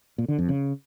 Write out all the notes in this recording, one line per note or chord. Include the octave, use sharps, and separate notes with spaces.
A#2
D3
F2
C#3